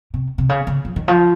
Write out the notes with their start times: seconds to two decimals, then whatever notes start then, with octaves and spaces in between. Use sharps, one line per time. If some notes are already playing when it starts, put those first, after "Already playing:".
0.14 C3
0.38 C3
0.49 C#3
0.67 C#3
0.85 F3
0.96 D#3
1.08 F3